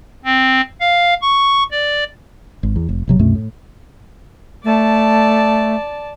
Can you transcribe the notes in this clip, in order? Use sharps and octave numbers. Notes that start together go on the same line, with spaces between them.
C4
F5
C#6
D5
G#1
E2
F1
G1 C3 F#3
C2 F#2 B2 A3
A2
A3 D5 A5